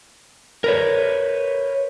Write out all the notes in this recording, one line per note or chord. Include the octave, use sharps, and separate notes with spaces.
A#4 B4 C#5